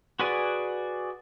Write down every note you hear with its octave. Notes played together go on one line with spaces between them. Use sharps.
F#4 G#4 B4 D5 G#5